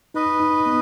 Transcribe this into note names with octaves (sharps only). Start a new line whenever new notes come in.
D#4 B4 D#5
D#4
B3